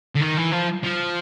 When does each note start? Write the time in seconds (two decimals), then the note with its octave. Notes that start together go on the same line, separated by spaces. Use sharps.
0.16 D3
0.22 D#3
0.38 E3
0.52 F3
0.83 F3